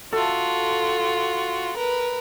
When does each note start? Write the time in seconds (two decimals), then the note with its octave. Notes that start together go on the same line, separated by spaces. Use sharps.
0.13 F4 F#4 A4
1.77 A#4 B4